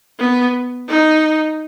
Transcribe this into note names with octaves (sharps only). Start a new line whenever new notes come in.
B3
D#4